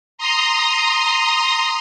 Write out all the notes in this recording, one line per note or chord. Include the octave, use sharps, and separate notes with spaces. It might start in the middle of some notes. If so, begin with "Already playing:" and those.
A#5 C6 D#6